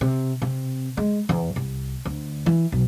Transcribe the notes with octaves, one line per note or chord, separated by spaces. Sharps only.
C3
C3
G#3
E2
C2
D2
E3
B1